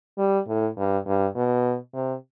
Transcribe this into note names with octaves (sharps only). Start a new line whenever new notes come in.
G3
A2
G2
G2
B2
C3